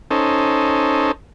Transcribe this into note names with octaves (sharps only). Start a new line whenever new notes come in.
C#4 D#4 A4 C5